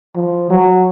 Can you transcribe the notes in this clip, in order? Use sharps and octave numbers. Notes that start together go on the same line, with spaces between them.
F3
F#3